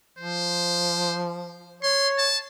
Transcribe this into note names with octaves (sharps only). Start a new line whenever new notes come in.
F3 C5
C#5 C6
A5